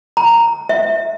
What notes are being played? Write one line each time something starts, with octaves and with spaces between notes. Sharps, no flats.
A#5
E5